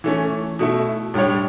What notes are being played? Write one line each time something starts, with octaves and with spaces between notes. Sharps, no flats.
E3 A3 C#4
B2 A3 E4
A2 G3 D4 G4 C#5